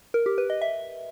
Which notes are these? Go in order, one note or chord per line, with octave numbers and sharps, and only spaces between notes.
A#4
G4
B4
D#5
E5